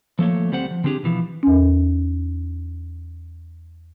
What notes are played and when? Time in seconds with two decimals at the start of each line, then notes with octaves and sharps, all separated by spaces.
0.19 F3 A3 A#3 C#5
0.51 D2 G3 C4 C5 F#5
0.71 F3
0.84 D3 C4 D4 G4 G#4
1.04 B2 E3 F3
1.43 E2 C#4